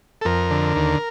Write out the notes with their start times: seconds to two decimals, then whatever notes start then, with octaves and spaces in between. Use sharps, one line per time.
0.21 A4
0.25 F2 A#4
0.51 D3
0.76 D#2